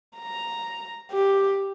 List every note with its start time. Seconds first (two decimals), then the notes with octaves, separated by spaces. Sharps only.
0.18 A#5
1.12 G4